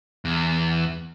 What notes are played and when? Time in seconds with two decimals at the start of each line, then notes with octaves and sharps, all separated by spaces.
0.25 E2